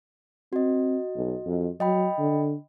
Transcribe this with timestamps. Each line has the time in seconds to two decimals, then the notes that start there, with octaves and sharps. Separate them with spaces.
0.53 C4 F#4 D#5
1.15 B1
1.46 F2
1.80 F#3 D#5 G5 B5
2.19 D3